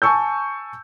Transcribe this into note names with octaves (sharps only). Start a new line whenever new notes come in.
G#5 A5 C#6 E6 G6